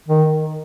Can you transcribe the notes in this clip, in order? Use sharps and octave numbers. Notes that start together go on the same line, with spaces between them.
D#3